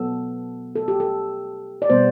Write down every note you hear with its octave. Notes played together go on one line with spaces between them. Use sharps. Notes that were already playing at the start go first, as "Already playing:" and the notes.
Already playing: B2 F#3 B3 A4
A4
G4
A4
D5
B2 G3 B3 C5